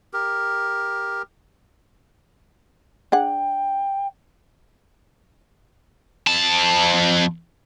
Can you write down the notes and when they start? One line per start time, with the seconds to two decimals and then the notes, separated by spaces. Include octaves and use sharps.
0.13 G4 A#4
3.12 D4 G#4 F#5 G5
6.27 F2 A5